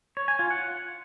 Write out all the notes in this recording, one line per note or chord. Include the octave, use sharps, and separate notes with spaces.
C#5
G#5
F4
F#5